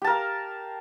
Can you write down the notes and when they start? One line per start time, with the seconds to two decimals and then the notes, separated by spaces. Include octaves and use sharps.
0.02 G4
0.04 A5
0.07 A#4
0.10 F5